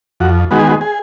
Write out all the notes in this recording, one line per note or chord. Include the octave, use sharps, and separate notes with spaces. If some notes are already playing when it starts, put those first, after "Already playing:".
F2 F#4
D#3 G#3 B3 F#4
G#4
F#4
G#4